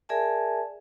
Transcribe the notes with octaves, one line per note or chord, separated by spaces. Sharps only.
G#4 A#4 D5 E5 G#5 A5